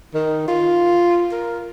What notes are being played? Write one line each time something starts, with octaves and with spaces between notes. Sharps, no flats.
D#3
F4
A#4